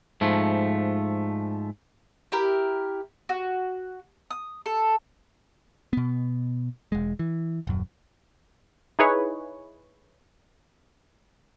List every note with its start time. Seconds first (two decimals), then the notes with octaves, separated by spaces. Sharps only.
0.21 G#2 F3 A3
2.32 E4 G4 A#4
3.29 F#4
4.31 D#6
4.66 A4
5.93 B2 B3
6.92 E1 G#3
7.19 E3
7.67 D#1 F#2
8.99 D#4 E4 G#4 B4 C#5